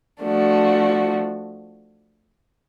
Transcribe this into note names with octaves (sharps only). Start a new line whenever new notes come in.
F3 A3 D4 F#4